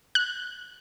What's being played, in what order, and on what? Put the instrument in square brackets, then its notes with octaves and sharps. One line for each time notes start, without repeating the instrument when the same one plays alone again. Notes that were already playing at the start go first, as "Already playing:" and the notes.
[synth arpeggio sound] F#6